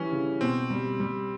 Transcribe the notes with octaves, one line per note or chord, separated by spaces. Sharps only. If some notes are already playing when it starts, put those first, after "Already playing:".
Already playing: E3 G3 C#4
C#3
B2 C4
G3
G3